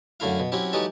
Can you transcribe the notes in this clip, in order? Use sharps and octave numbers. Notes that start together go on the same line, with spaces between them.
F#2 D3 A3 E4 F5
B2
F#3 C4 C#4 E4 G4
E3 F#3 G#3 D#4 G4 A4